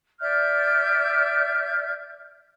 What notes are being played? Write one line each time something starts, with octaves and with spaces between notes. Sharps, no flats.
D5 E5 F6 G6